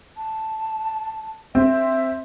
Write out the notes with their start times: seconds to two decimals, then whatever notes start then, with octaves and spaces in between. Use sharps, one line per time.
0.17 A5
1.55 C4 E5